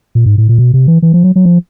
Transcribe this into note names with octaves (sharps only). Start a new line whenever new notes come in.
A#2
G#2
A2
A#2
B2
C3
E3
E3
F3
F#3
F#3
F3